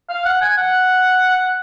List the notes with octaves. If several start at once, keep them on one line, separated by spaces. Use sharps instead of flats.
F5
F#5
G#5
F#5